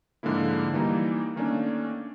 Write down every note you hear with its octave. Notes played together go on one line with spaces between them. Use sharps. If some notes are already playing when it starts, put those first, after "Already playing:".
G#2 D3 F3 G#3 A#3 E4
E3 G3 A#3 D#4
D#3 A3 A#3 C#4 D4